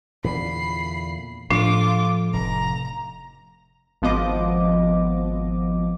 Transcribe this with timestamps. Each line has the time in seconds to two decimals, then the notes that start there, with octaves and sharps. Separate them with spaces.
0.24 E2 A#2 D3 B5 C7
1.50 A2 F3 A3 D4 F4 D6
2.33 F1 A#5
4.02 G#1 F3 B3 D#5 D6